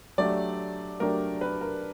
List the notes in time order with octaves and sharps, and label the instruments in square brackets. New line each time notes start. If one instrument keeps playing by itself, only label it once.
[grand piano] F#3 A3 D4 G4 [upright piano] D5
[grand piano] F#3 A3 D4 G4 [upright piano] A#4
[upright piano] B4
A#4